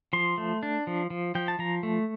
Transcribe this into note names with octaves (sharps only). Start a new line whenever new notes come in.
F3 C6
A3
D4
F3
F3
F3 G5
A5
F3 A#5
A3